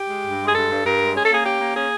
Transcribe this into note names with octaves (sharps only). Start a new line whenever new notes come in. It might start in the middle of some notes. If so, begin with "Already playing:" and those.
Already playing: G4
G#3
G2
G#3
G#4
G2 A4
G2
G2 A#4
G#3
C#4 G#4
A4
A#3 G#4
C#4 G4
A#3
C#4 G#4